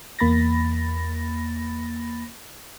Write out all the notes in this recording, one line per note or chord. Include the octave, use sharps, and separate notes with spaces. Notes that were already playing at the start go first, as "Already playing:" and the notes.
E2 A#3 B5 A6 A#6